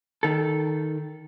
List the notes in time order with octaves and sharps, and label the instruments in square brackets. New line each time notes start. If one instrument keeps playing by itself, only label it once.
[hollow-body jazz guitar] D#3 A4